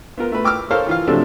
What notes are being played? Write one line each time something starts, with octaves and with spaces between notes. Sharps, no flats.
B3 F4 A#4
A3 B4
G5 D6 E6 F6
A4 A#4 C5 C#5 F5
E3 F4 F5
C3 F3 F#3 A3 D4 A4